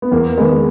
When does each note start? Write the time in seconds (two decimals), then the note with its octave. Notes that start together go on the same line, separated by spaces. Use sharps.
0.02 B3
0.11 E2 A#3
0.38 D#3 G#3 B3